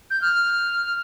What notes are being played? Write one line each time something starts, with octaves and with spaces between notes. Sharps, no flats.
G6
F6